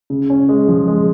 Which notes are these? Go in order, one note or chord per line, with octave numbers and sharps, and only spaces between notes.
C#3
C#4
G#3
F3
G#3